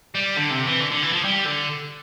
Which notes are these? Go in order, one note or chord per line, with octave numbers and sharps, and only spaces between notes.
G3
D3
C3
E3
D3
D3
E3
F3
G3
D3